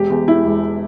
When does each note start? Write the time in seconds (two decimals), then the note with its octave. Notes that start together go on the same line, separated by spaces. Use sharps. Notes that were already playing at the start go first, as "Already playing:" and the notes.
Already playing: E1 G4
0.10 E2
0.27 E1 E4
0.45 E1